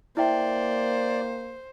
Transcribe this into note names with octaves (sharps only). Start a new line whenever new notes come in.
A#3 E4 C5 D5 E5 G5